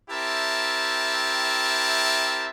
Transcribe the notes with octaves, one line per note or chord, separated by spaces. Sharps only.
C4 E4 G4 A#4 E5 A5